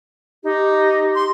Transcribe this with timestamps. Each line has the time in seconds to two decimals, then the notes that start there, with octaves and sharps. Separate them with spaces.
0.44 D#4 G4
1.15 C6